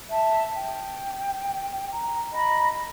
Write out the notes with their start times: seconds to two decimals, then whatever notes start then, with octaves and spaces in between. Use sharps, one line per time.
0.10 E5 A5
0.54 G5
1.91 A#5
2.33 D#5 A#5 B5